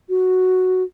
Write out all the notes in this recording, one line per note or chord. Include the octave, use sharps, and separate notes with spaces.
F#4